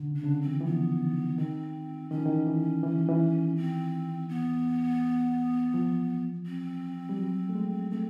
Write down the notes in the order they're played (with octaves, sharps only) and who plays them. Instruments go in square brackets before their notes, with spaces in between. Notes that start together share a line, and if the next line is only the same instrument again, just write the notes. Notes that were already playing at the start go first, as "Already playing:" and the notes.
Already playing: [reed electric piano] D3
C#3
[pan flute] D4
[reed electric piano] C#3
D3
[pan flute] C4
[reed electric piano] E3
E3
[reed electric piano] F3 [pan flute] B3
[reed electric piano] D#3
[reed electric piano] D#3 [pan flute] C4
[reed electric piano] D#3 [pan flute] C#4
[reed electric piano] E3
D#3
E3
E3
D#3
E3
[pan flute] C4
B3
[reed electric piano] F3
[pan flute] C4
[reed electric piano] G3
F#3
A3
G#3
[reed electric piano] A3 [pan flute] C4